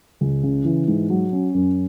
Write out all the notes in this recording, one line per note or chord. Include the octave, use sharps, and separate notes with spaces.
C#2
C#3
E3
G#2
F#3
C#4
F#2